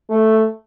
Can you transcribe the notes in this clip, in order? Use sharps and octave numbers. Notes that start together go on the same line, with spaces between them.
A3